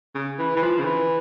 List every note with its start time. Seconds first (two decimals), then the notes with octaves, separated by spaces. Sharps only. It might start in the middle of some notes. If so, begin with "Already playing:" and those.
0.15 C#3
0.39 E3
0.56 E3
0.62 F3
0.79 C#3
0.85 E3